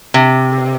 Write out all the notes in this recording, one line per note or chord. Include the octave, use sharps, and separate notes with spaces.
C3